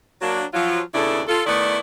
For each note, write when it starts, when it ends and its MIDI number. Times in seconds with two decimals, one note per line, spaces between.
0.21 0.43 54
0.21 0.43 58
0.21 0.43 62
0.54 0.79 53
0.54 0.79 54
0.54 0.79 65
0.94 1.22 39
0.94 1.22 49
0.94 1.22 59
0.94 1.22 62
0.94 1.22 64
0.94 1.22 69
1.28 1.41 65
1.28 1.41 69
1.46 1.77 51
1.46 1.77 57
1.46 1.77 59
1.46 1.77 64
1.46 1.77 74